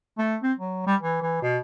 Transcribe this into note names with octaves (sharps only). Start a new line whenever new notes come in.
A3
C4
F#3
G3
E3
E3
B2